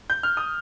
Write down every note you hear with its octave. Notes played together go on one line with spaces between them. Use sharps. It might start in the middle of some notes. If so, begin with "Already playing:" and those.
G6
F6
D#6